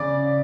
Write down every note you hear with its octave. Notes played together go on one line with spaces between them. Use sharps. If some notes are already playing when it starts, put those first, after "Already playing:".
Already playing: C#3 D5 D6